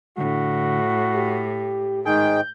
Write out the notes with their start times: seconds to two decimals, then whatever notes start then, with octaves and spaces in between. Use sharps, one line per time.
0.18 A2 D3 F#4
1.14 G4
2.06 G#2 D#3 G#4 G5 G6